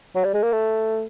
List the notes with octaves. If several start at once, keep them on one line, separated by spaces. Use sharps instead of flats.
F#3
G3
G#3
A#3
A3